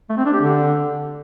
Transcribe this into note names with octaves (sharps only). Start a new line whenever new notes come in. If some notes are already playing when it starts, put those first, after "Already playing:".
A3
C4
D4
G4
D3